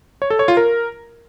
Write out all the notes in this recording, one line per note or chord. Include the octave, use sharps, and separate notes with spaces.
C#5
A4
C#5
F4
A#4